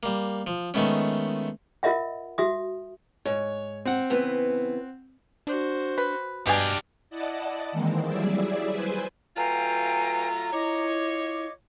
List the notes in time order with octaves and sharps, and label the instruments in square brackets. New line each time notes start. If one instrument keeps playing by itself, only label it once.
[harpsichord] G3 A#3
F3
D#3 G#3 A3 B3 C#4
[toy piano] F4 A#4 D#5 E5 F#5
F#4 E5 D#6
[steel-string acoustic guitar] G#2 [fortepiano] C#5
[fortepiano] C4 F#5
[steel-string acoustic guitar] C#3 E3 B3
[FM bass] D4 [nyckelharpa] F#4 C5
[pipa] B4
[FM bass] G2 [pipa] B2 G#5 [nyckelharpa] D4 [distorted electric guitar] G4 F5
[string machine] E4 D5 D#5 F#5 A5
D#3 E3 G#3 A#3 C4
F#3 G3 E4 G#4 D5 E5
B4 C5 G#5
[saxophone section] F#3 A3 F4 [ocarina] B4 [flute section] F5 G5 G#5 [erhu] A#5
[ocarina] E4 [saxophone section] F4 C#5 [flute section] D#5 D6